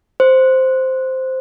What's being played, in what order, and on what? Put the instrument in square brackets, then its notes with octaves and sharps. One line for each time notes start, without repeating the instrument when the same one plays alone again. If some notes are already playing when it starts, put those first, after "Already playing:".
[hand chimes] C5